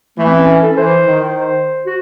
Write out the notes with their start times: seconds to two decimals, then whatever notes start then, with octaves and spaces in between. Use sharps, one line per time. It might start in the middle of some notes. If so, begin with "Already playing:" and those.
0.18 E3 A3
0.28 C4
0.37 C#4
0.48 C#4
0.62 A4
0.77 E3 C5
1.07 D#3
1.37 C5
1.86 F#4